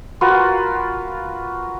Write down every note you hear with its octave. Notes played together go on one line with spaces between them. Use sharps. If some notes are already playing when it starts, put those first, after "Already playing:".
F4 F#4 A#4 B4